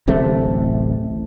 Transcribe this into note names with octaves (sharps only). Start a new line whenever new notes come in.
D1 A1 C3 A3